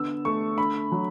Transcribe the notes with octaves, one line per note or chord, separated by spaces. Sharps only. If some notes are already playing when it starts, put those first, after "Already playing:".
Already playing: D3 B3 E6
A3 C#6
D3 B5
F#3